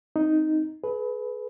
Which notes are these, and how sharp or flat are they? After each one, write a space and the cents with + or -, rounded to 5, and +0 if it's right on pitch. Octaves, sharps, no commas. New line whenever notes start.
C4 +0 D#4 +0
G#4 +40 B4 +0